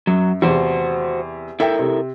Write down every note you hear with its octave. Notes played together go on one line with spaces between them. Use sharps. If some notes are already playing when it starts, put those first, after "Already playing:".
F#2 F#3
E2 C3 F#4 C5
E4 A4 A#4 E5 G5
C3